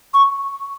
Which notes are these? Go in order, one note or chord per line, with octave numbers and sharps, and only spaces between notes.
C#6